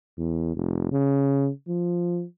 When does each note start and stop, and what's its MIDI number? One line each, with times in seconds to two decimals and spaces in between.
0.18 0.51 40
0.56 0.88 29
0.92 1.49 49
1.68 2.24 53